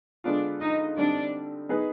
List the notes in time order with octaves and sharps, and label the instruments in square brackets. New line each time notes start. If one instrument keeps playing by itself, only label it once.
[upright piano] D3 G#3 B3 F4 [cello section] D4 D5
[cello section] D#4 D#5
[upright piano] D3 G3 C4 D#4 [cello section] D4 D5
[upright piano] B3 D#4 G#4 B4